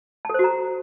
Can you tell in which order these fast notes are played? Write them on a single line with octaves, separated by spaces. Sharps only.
A5 A4 C5 F#4 A#5